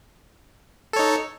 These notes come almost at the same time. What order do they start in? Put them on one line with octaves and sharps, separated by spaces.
A4 C#5 D#4